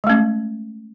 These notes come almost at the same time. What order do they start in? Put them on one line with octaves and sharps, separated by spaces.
G#3 A3 C#4